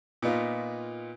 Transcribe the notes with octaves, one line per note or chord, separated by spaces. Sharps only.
A#2 B3 D#4 F4